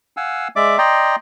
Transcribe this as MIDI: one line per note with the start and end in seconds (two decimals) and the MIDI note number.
0.17 0.48 77
0.17 0.48 78
0.17 0.48 80
0.17 0.48 88
0.56 0.78 56
0.56 0.78 74
0.56 0.78 76
0.56 0.78 86
0.78 1.16 74
0.78 1.16 75
0.78 1.16 79
0.78 1.16 82
0.78 1.16 84